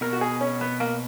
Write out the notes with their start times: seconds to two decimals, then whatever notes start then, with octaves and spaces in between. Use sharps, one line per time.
0.01 B2 A#4
0.13 F#4
0.21 G#4
0.41 C#4
0.61 B3
0.80 A#3